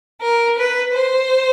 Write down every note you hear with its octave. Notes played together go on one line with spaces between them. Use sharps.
A#4
B4
C5